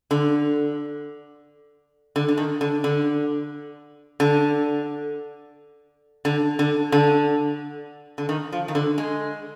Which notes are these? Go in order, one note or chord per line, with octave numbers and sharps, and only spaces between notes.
D3
D3
D3
D#3
D3
D3
D3
D3
D3
D3
D3
D#3
F3
D#3
D3
G#3